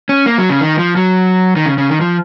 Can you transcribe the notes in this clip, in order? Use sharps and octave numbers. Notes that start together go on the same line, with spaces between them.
C#4
A#3
F#3
C#3
D#3
F3
F#3
D#3
C#3
C#3
D#3
F3